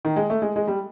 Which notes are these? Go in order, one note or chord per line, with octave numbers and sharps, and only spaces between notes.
D#3
G#3
A3
G#3
G#3
G3